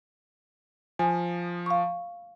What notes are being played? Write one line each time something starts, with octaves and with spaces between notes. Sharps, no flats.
F3 G#5
F5 C#6